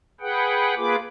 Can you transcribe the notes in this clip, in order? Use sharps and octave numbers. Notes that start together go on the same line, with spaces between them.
G#4 B4 F#5 G5
A#3 F4 G#4 B4 D6